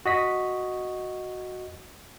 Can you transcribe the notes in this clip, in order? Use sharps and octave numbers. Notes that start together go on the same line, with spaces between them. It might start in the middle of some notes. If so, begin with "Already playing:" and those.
F#4 D#5 B6